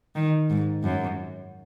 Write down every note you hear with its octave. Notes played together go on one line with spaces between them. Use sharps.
D#3
G#2
F#2